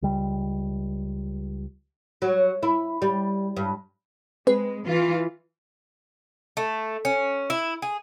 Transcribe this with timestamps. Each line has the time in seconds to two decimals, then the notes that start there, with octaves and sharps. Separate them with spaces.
0.02 C#2 G3
2.22 F#3
2.63 E4
3.02 G3
3.57 G2
4.47 G#3 C4 G#4 B4
4.86 E3 F4
6.57 A3
7.05 C#4
7.50 E4
7.82 G#4